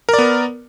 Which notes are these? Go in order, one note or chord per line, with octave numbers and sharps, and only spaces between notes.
B3 A#4 D5